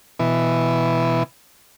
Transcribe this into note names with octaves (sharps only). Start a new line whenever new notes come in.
B2 E3